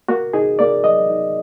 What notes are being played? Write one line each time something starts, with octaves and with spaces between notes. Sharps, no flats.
A#3 F#4
D#4 G#4
A#3 D5
F#3 D#5
D#4